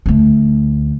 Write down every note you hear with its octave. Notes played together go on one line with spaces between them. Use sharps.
D2 A3